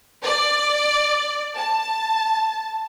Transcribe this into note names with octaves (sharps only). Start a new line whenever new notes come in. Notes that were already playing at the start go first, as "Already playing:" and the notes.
D5
A5